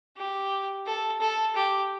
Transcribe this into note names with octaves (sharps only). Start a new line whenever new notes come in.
G4
A4
A4
G4